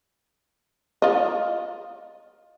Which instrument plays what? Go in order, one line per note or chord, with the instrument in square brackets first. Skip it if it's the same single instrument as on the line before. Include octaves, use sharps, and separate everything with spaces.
[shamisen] F4 D#5